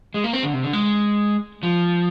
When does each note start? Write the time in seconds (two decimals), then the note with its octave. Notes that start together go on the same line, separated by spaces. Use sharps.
0.14 G#3
0.24 A#3
0.33 C4
0.43 D3
0.53 C3
0.63 D3
0.73 G#3
1.63 F3